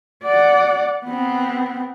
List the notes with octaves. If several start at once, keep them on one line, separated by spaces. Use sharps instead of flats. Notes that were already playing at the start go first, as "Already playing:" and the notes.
D5 F#5
B3 C4